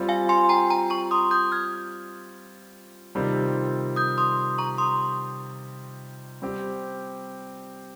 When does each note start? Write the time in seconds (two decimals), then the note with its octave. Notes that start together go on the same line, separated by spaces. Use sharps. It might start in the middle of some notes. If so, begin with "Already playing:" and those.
Already playing: G3 C4 F4
0.09 F5 G#5
0.29 G#5 C6
0.49 G5 A#5
0.70 G5 A#5
0.90 A#5 C#6
1.11 C6 D#6
1.31 D#6 G6
1.52 F6 G#6
3.15 C3 D#3 G3 C4 F4
3.96 D#6 G6
4.18 C6 D#6
4.58 A#5 C#6
4.78 C6 D#6
6.42 G3 C4 G4